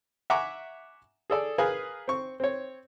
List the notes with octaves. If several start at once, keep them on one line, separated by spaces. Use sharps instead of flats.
E5 F#5 G#5 A#5 C#6 D6
G#4 A4 D5
G#4 A#4 B4 F5 G#5
C4 C#6
C4 C#5